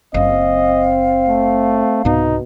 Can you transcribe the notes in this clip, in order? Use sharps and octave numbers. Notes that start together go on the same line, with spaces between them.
F#1 F#2 C4 D#5 F5
A3
C2 G#2 B2 B3 D#4